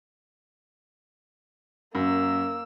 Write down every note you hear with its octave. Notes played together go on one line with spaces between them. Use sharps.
F#2 A#3 E6